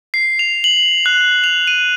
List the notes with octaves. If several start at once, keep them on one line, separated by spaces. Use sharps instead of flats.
C7
F7
F#7
F#6
F7
D#7